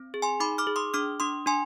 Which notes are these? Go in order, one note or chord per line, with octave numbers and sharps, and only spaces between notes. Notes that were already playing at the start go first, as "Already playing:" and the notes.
Already playing: C4
G#4
G#5 C6
D#4 B5 D6
D6 F6
G#4
C6 D#6
D4 D6 F6
D4 C6 D#6
D4 G#5 C6